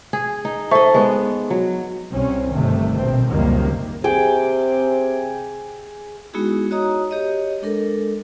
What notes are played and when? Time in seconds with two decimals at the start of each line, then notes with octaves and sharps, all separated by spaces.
0.13 G#4
0.45 D#4
0.71 A4 C5 D#5 E5 C#6
0.94 G#3 B3
1.50 F#3
2.10 C2 C4 C#4
2.53 G1 C3 D#3 A3
2.95 A#1 B2 C4
3.29 C#2 F#2 C3 D#3 G3 A#3
4.04 C3 G#4 G5 D6
6.34 G#3 B3 D#4 E4 F#4 G#4
6.71 F#4 C#5 D#5 A#5 D#6
7.11 G4 C#5 D#5
7.62 G#3 D4 A4 A#4